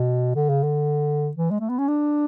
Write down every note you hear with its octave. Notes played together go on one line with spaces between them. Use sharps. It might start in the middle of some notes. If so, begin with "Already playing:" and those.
Already playing: B2
D3
C#3
D3
E3
G#3
A3
B3
C#4
D4